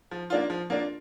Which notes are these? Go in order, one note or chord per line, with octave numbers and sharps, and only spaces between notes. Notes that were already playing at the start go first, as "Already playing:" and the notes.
F3
A#3 D4 F4
F3
A#3 D4 F4